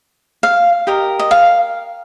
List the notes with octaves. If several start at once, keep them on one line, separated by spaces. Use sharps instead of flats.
F5
G4 A#4 D#5
D#5
F5